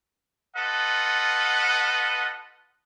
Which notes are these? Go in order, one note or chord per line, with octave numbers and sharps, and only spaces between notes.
F4 A4 B4 D#5 F#5